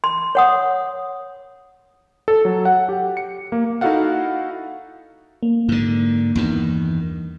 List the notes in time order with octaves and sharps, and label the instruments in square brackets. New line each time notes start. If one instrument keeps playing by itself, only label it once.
[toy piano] C6
C#5 F#5 D#6
[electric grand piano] A4
F#3
F#5
G4
C#7
A#3
D#4 E4 F#4 A4 F5 F#5
[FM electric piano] A#3
[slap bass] G#2 D3
E2 G2 D#3